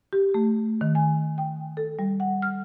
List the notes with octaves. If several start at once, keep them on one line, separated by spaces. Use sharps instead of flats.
G4
A3
D#3
G#5
G5
A4
G3
F#5
F6